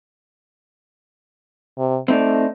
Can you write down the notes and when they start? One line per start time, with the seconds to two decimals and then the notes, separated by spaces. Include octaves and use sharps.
1.78 C3
2.08 A3 C4 D#4 D5